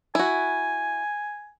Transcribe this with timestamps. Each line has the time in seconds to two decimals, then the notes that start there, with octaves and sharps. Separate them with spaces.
0.15 E4 F#4 G#5